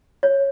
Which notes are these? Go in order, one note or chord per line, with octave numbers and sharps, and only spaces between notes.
C#5